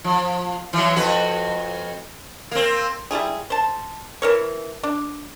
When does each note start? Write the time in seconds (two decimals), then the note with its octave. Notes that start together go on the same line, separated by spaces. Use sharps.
0.04 F3
0.73 E3 F#3
0.96 F2 F#4 B4
2.51 A#3 C4
3.11 G3 E4 F4 G#4
3.50 C5 A5
4.22 E3 A#4 C#5
4.83 D4